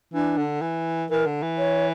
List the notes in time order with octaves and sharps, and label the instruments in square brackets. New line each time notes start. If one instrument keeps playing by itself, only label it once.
[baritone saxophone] E3 [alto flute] D4
[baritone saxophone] D3
E3
[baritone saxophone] E3 [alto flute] A#4
[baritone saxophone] D3
E3
[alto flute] C#5